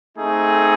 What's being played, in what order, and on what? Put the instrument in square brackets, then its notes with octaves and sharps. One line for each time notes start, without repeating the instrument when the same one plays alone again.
[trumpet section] A3 C4 D#4 G#4